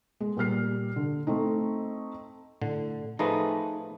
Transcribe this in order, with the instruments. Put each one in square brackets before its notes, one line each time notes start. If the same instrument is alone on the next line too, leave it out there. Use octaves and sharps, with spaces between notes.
[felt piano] G#3
A#2 G3 F6 C7
D3
A3 C4 D#4
[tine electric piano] A2 [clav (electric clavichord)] D3
[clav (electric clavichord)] F3 A3 A#5 [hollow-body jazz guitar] D#4 G#4 B4 [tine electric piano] A5